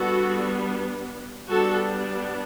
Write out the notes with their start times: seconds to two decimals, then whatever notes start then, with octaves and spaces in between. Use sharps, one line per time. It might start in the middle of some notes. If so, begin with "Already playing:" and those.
Already playing: G3 B3 D4 F#4 A4
1.49 G3 B3 D4 F#4 A4